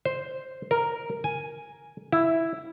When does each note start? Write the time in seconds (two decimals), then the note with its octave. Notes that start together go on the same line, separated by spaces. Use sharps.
0.05 C5
0.71 A#4
1.24 G#5
2.12 E4